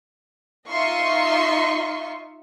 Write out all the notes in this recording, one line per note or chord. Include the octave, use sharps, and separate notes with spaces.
D#4 F4 D#5 E5 C6 C#6